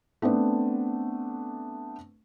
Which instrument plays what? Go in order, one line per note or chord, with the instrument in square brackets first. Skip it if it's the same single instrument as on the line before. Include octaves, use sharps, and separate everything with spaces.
[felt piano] A3 B3 C4 D4